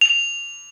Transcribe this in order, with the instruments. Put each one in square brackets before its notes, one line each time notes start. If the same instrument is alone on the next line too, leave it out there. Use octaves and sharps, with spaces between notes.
[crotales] F7